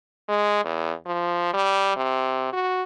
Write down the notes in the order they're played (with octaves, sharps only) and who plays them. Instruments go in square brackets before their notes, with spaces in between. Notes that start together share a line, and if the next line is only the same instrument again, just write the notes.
[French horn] G#3
E2
F3
G3
C3
F#4